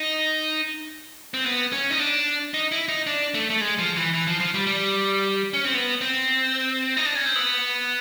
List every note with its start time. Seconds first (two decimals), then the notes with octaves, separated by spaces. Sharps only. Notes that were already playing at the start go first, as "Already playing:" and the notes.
Already playing: D#4
1.34 C4
1.46 B3
1.73 C#4
1.91 D#4
2.00 D4
2.54 D#4
2.72 E4
2.88 D#4
3.07 D4
3.34 A3
3.50 A3
3.61 G#3
3.78 F3
3.96 E3
4.14 E3
4.27 F3
4.40 F3
4.54 G3
4.67 G3
5.54 C#4
5.64 C4
5.74 B3
6.01 C4
6.97 D#4
7.06 D4
7.15 C#4
7.25 C4
7.35 B3